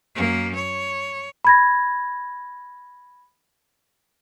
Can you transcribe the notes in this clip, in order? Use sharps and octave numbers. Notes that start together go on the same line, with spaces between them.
F#2 A#3
C#5
B5 G#6 A#6